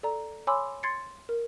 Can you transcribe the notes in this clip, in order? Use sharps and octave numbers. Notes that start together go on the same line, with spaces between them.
A4 D5 A#5
C#5 G#5 B5 C6 D6 E6
C6 G#6 A6 C7 C#7
A#4